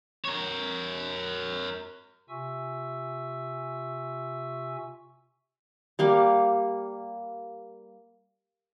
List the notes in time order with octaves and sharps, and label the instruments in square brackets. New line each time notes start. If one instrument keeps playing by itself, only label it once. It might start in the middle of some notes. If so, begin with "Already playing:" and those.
[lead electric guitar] A#4 C#5
[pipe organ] C3 F4 E5 G#5 C#6 E6
[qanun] G3 A#3 F5